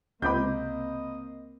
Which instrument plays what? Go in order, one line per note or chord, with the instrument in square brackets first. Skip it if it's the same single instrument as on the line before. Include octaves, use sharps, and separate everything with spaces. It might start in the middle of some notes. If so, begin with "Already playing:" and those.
[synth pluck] C#2 C3 [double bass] A#3 C4 [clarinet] D#5 [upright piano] B5 D6 G6